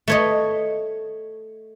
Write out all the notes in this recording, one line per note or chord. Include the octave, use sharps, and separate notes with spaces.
A3 C#5 D#5